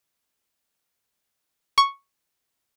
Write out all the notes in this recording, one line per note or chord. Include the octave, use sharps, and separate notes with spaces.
C#6